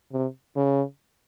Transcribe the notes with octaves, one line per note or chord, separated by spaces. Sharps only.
C3
C#3